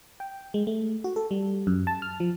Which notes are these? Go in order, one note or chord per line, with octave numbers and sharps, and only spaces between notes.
G5
G#3
A3
F#4
A4
G3
F#2
A5
F6
F3